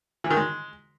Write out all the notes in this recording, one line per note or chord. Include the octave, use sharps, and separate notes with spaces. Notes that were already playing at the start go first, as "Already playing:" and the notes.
E3
D#3
G#3